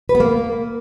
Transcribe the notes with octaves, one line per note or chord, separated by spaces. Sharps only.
B4
B3
A#3